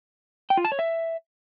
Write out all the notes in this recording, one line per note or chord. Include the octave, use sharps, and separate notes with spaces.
G5
F4
A5
C#5
E5